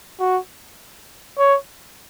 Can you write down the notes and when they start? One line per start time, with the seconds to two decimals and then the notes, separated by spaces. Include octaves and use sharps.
0.20 F#4
1.38 C#5